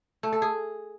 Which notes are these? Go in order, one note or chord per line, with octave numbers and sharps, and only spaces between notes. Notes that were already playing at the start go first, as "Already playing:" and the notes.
A3
A4
G#4